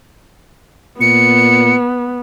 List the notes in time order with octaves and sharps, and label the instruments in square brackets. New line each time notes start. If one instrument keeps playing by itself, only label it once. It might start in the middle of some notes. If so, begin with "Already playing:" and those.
[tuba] A#2 [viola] B3 [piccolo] C#7